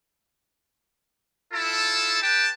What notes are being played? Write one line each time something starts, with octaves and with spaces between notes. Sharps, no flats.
E4 F4 A4 A5
G4 B4 G5 A5